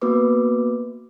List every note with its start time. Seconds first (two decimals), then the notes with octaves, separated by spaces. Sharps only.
0.02 A#3 B3 F#4 B4 D6